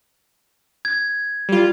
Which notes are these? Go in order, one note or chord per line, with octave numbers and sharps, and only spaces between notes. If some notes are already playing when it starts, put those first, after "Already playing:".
G#6
G3 F4